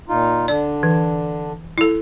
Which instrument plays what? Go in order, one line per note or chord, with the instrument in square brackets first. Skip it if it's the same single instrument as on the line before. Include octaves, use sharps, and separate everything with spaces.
[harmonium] A#2 D#4 F4
[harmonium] D3 D4 [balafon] D5
[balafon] E3
E4 A4